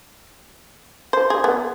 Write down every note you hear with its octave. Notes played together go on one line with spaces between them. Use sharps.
C5
G#4
B3